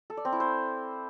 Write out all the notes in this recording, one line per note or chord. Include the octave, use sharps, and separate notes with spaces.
A4
D5
C4
E4
C5